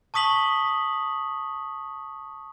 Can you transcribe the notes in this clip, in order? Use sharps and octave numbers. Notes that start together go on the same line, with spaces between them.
A5 C#6 D#6 B6 F#7 G7